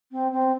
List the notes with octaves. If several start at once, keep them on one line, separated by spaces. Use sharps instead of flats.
C4
C4